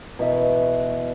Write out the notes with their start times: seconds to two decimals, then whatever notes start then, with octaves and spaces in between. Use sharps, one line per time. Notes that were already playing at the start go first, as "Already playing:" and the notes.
0.19 B2 E3 F#4 E5